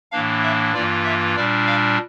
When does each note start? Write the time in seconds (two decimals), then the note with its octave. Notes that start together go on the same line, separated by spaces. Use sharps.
0.11 A2 E3 A#3 D4 F5
0.43 E5
0.74 G2 E3 A#3 F4 D5
1.05 E5
1.36 A#2 G3 D4 D5
1.67 F5